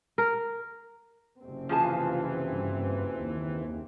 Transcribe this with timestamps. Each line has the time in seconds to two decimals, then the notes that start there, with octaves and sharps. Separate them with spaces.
0.18 A#4
1.41 F#1 C3 C4
1.69 E3 F3 F4 G#4 A5
2.51 G2
3.18 D#2